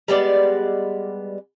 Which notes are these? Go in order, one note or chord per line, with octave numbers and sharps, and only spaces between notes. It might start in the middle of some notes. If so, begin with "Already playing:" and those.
G3 G#3 B3 D5